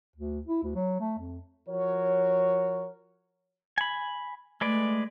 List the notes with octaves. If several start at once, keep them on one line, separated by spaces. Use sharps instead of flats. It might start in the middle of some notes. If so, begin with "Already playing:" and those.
D2
E4
D2
F#3
A3
F2
F3 F#4 A#4 C#5
G#5 B5
G#3 A3 B4 D5